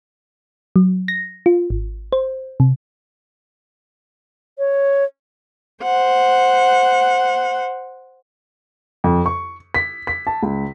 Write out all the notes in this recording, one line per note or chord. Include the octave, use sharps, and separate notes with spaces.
F#3
A#6
F4
G#1
C5
C3
C#5
C5 F#5
F2
C#6
B6
B6
A5
C#2